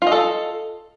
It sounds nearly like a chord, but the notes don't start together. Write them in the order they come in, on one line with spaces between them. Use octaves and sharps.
F4 D#5 A4